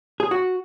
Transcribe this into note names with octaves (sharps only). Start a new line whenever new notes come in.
G#4
F#4